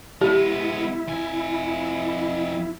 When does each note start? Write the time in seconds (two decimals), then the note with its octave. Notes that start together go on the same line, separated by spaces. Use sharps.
0.21 G#3 B3 E4 G4
1.08 F2 G#5